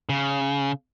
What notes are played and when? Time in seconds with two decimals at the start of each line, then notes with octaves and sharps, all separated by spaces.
0.09 C#3